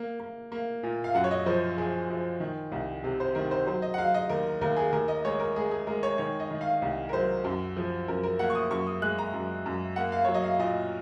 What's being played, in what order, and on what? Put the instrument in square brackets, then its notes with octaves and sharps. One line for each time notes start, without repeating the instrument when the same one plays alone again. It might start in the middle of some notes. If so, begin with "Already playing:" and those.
Already playing: [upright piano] A#3
A#3
A#3
A#2
F5
F#2 F#5
C#5
D#5
F3 C5
F3 G#4
F3
D#3
C2
C3
C5
D#3 A#4
C5
F#3 C5
D#5
F#5
F#3 F5
D#5
D#2 A#4
D#2 A#4
G#4
D#2 A#4
D#5
G#3 C#5
A#4
G#3 G#4
G#4
G#3 A#4
C#5
D#3 C#5
D#5
D#3
F5
C2
A#4
F#3 C5
F#2
F3
F#2 A#4
A#4
A#3 F#5
C#6
D#6
F#2 C#6
D#6
G#3 F#6
A#5
F#2
F#2
A#3 F#5
F5
F#3 C#5
D#5
F5
A#2 D#5